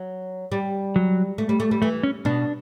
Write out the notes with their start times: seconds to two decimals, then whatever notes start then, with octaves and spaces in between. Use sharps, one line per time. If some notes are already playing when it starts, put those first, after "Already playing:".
Already playing: F#3
0.52 G3
0.96 F#3
1.38 A3
1.49 G3
1.60 A3
1.71 G3
1.82 E3 A3
2.03 C#4
2.25 B2 D4